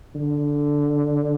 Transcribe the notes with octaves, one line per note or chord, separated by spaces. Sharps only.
D3